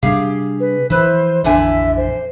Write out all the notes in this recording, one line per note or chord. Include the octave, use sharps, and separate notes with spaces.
C3 G3 D4 G4 G#4 F5
B4
E3 F3 E4 B4 C5
A#1 F2 D3 E3 D4 E5 G#5
C5